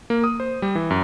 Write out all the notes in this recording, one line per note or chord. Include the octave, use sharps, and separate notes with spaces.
A#3
D#6
C5
G3
E3
F#2